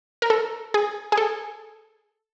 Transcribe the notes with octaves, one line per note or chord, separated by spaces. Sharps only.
A#4
A4
G#4
G#4
A4